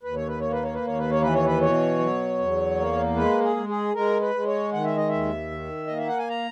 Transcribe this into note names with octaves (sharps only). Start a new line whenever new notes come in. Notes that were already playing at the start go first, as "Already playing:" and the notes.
D#2 B4
C#5
B4
A#3 C#5
B4
C#5
B4
D#2
C#5
B4
C#5
E3 B4
C#5
B4
B2 C#5
F#3
E2
A#3
G#3 B4
G#4
G#3
G#4
G#3 A#4
B4
G#3
C#5
D#3 F#5
E5
D#5
D#2 E5
D#3
A#3 D#5
E5
F#5
G#5
A#5